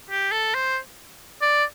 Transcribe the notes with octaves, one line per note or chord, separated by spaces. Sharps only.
G4
A4
C5
D5